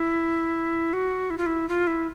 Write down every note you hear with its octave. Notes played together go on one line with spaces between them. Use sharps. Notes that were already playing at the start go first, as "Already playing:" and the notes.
Already playing: E4
F#4
E4
F4
E4
F4
E4